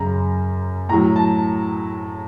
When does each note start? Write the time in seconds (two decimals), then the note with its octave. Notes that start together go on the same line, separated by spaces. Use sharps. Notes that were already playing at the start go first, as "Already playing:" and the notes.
Already playing: F#2 C#3 F#3 A#5
0.89 A2 F#3 A#5
1.16 A5